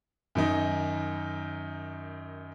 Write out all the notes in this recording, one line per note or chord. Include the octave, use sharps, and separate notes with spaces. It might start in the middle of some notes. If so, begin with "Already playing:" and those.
F#2 D#3 D#4